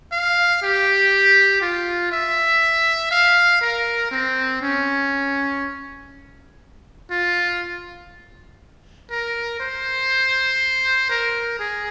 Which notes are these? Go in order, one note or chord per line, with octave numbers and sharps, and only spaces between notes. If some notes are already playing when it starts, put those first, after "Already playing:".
F5
G4
F4
E5
F5
A#4
C4
C#4
F4
A#4
C5
A#4
G#4